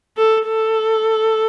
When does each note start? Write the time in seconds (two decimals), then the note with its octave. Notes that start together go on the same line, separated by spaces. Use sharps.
0.17 A4
0.47 A4